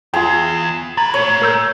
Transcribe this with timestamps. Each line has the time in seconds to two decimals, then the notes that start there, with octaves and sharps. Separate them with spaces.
0.14 E2 F4 G#4 G5
0.97 F#3 B4 A#5 G#6 A6
1.14 A#2 A3 C#5
1.42 A#4 E6 G6